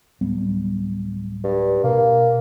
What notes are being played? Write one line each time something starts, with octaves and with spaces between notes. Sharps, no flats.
D1 G3 B3
G2
B2 A#3